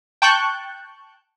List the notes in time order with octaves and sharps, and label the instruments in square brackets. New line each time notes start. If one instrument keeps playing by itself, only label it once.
[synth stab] G5 A5 C#6 F#6 G6